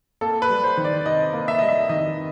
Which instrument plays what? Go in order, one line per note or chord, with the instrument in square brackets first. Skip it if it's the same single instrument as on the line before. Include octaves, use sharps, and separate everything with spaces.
[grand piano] A#3 A4
B4
G3
C5
D#3
D5
C3 D#5
A#3
E5
G3 D#5
E5
D#3 D#5